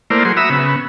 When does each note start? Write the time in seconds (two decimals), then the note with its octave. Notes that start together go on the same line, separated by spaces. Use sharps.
0.10 A3 A#3 E4 A#4 C5 D5
0.25 F#3 G#4 C6
0.37 F#4 E5 A#5 B5 D#6 E6
0.50 C#3 B3